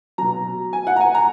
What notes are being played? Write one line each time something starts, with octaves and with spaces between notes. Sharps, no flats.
B2 F#3 A#5
G#5
F#5
A#5
G#5
A#5